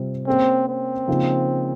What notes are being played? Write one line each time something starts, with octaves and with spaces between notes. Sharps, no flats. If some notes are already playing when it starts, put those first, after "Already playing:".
Already playing: C3 G3 C4 F4
A#3 C4 C#4 G#4 C5
C4
C#3 F3 A#3 D#4